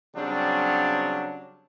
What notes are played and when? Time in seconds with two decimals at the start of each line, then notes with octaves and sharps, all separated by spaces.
0.15 C#3 F#3 G3 C4 D4